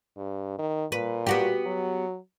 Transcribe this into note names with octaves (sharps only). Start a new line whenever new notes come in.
G2
D#3
A#2 B4
B3 F#4 G4
F#3